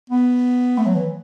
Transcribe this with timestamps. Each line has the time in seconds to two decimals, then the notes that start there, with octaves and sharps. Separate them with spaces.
0.10 B3
0.78 A3
0.86 F#3
0.95 E3